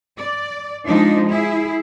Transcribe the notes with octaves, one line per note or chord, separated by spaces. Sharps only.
D5
F3 G#3 D4 D#4
E4 G#4